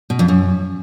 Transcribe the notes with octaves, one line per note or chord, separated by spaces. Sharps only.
B2
F2
F#2